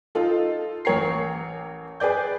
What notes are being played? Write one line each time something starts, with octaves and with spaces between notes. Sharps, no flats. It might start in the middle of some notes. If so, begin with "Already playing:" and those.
D#4 F4 A4
A1 A#4 C#5 A#5 C7
G#4 B4 D5 G6